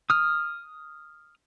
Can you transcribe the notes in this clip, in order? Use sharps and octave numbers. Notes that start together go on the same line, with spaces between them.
D#6 F6